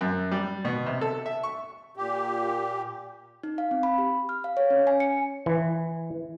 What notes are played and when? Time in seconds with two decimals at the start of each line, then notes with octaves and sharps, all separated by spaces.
0.01 F#2
0.31 G3
0.65 B2
0.86 C3
1.01 A4
1.26 E5
1.43 C#6
1.96 A#2 G4
3.43 D#4
3.58 F5
3.71 C4
3.83 B5
3.98 G4
4.29 F6
4.44 F5
4.57 C#5
4.70 C#4
4.87 G#5
5.00 C#7
5.46 E3